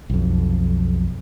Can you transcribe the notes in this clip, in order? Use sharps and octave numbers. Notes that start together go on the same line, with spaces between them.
B1 F2